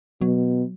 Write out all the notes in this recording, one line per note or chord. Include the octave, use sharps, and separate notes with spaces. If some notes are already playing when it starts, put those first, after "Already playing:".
B2 F#3